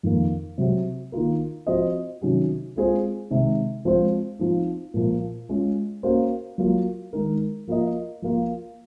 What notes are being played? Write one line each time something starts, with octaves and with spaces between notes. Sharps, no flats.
F2 D#3 A#3
C3 F#3 C4 F#4
D#3 A#3 F4 A#4
F3 C4 F#4 C5 D#5
C3 D#3 F#3 C#4 F#4
G#3 C4 F4 G#4 C5
C3 D#3 G#3
F3 G#3 C4 F4 C5
F3 C4 D#4
A#2 F3 A#3
G#3 C#4 F4
A#3 C#4 F#4 C5
F#3 A#3 F4
D#3 G#3 D#4 A#4
F3 A#3 F4 A#4 D#5
F3 A#3 F4